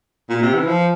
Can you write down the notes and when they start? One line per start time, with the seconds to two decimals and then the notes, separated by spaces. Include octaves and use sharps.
0.30 A#2
0.42 C3
0.54 E3
0.67 F3